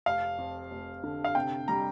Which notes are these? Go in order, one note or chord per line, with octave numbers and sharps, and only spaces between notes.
F1 F5
F2
F1
D3
F5
C3 G5
G3 A#5